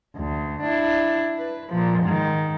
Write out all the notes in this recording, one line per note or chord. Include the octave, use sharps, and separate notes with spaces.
D2
D4 E4
B4
A#2 F3
G#2 D#3